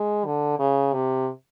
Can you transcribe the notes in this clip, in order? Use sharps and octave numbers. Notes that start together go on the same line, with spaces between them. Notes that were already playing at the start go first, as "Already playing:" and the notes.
Already playing: G#3
D3
C#3
C3